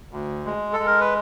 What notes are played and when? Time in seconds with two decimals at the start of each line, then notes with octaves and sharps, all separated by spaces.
0.11 D2
0.45 G#3
0.73 A4
0.80 G#3
0.87 A#4
1.00 B4